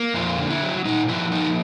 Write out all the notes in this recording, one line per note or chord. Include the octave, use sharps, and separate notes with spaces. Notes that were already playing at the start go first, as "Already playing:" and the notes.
Already playing: A#3
F2 F4
D3
E4
F#3
A#2 D#4
F3 E4
A#3 D#4